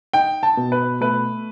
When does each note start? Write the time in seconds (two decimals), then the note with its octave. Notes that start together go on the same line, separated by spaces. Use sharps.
0.13 D#4 G5
0.43 A5
0.57 B2
0.72 B4
1.01 A3 B4